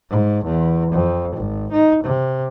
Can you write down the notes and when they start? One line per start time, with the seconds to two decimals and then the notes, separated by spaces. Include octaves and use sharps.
0.10 G#2
0.45 E2
0.92 F2
1.37 G#1
1.72 D#4
2.04 C3